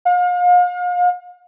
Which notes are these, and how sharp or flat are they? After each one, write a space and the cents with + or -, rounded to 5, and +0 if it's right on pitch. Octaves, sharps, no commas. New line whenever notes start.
F5 +40